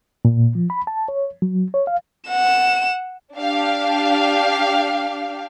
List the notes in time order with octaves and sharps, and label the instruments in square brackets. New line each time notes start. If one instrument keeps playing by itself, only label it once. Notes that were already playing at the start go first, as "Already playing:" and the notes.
[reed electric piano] A#2
F3
B5
A5
C#5
F#3
C#5
F5
[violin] F#5 E7
[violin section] D4 G4 F5